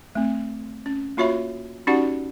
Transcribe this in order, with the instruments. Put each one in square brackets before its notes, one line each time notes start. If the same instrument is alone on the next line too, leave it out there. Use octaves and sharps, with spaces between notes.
[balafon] A3 C4
C#4
A#3 F4 F#4 C#5 E5 B5
C#4 D#4 F#4 G4 D5 F#5